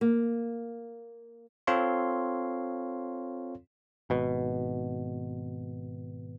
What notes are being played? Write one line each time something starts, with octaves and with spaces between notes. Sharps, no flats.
A#3
C4 F4 A4 C#5 F5 C6
G#1 B2